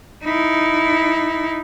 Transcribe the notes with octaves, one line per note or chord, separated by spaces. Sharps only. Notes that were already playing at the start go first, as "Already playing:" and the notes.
D#4 E4